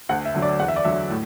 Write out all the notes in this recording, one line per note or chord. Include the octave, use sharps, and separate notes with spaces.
D2 F#5
E5
D3 F#3
D5
E2 F#5
E5
D5
D3 F#3 E5
A2